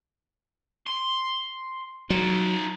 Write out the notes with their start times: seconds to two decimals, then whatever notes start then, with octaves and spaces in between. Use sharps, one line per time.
0.87 C6
2.10 F#3 D#4 F4